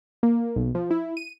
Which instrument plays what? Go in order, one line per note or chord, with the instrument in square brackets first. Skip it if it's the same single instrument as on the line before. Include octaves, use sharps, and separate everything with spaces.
[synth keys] A#3
B1
F3
E4
D#7